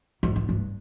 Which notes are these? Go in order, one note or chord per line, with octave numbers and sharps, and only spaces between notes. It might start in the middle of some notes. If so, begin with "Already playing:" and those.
G#2
G2
G2